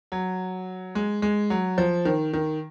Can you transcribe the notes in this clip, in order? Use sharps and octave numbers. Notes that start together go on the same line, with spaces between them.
F#3
G#3
G#3
F#3
F3
D#3
D#3